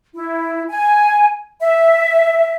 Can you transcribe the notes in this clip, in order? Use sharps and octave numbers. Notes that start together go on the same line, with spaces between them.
E4
G#5
E5